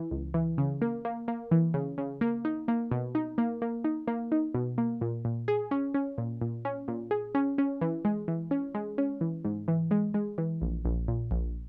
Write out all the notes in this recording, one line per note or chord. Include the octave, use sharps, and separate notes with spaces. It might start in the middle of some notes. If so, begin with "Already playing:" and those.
Already playing: E3
C#2
E3
C#3
A#3
A#3
A#3
E3
C#3
C#3
A#3
D#4
A#3
B2
D#4
A#3
A#3
D#4
A#3
D#4
B2
A#3
A#2
A#2
G#4
C#4
C#4
A#2
A#2
C#4
A#2
G#4
C#4
C#4
E3
G#3
E3
C#4
G#3
C#4
E3
G#2
E3
G#3
G#3
E3
A#1
A#1
A#2
A#1